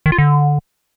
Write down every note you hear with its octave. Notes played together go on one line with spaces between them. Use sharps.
D#3
F4
D3